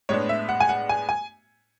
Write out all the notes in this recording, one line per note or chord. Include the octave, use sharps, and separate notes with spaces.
A2 G#3 B3 D4 C#5
E5
F#5
G#5
F#5
G#5
G#5